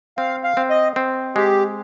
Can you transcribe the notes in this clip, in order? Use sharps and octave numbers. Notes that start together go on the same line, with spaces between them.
C4 F5
F5
C4
D#5
C4
G#3 G4